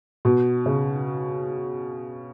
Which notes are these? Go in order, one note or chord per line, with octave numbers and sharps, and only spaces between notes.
B2
C#3